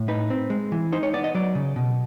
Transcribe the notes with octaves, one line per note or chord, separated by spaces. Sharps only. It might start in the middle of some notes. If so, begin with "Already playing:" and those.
Already playing: A2
D#4 B4
C4
G#3
E3
D#4 C5
C#5
B3 D5
D#5
F#3 D5
C#3
B2